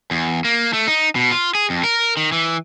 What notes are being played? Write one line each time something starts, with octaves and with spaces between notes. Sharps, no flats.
E2
A#3
A3
D#4
B2
F4
G#4
F2
A#4
D#3
E3